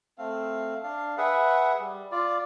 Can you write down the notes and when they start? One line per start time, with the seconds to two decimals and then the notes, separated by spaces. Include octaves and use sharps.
0.18 A3 C4 F5
0.83 D4 F5
1.18 G#4 B4 E5 F#5
1.79 G3
2.11 F4 D5